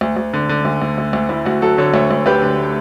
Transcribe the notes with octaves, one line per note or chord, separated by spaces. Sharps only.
D2
D2
D3
D3
D2
D2
D2
D2
D2 E4
D2 F#4
F#3 F#4 A4
D3 A4 C#5
D2 C#5 E5
D2
D2 G4 B4
D3